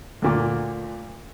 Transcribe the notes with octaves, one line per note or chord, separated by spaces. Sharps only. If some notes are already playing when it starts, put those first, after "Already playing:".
D2 A#2 D6